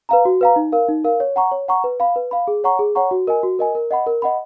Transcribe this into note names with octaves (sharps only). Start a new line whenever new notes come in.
B4 F5 A#5
F#4
B4 F5 A#5
D#4
A#4 F5
D#4
A#4 F5
C#5
F#5 A#5 C#6
C#5
F#5 A#5 C#6
B4
F5 B5
B4
F5 B5
G#4
C#5 F#5 A#5 C#6
G#4
C#5 F#5 A#5 C#6
F#4
A#4 D#5 G#5
F#4
A#4 D#5 G#5
A#4
D#5 F#5 B5
A#4
D#5 F#5 B5